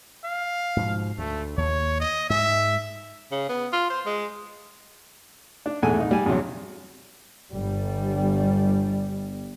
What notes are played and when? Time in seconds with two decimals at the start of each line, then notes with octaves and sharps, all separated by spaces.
0.24 F5
0.76 G#2 B2 F3
1.18 D2 A3
1.58 D#2 C#5
2.00 D#5
2.30 G#2 G#3 E5
3.32 C#3
3.49 B3
3.73 F4
3.90 C5
4.06 G#3
5.66 D4
5.83 E2 G#2 A3 A4 G#5
5.98 C2 D#4
6.11 G3 G#5
6.26 E2 G2 C3 F#3
7.53 G1 G3